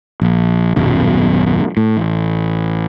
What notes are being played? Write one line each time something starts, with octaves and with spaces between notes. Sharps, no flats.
A#1
D#1 B1 F#2 B2
A2
A1